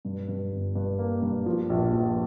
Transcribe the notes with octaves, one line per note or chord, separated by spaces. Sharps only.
G2
G2
G1
G2
A#3
G2
F3
A#1
A#1